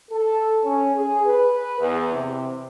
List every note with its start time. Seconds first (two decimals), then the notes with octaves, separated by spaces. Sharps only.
0.11 A4
0.64 C#4
0.95 G#4
1.26 B4
1.79 E2
2.13 C3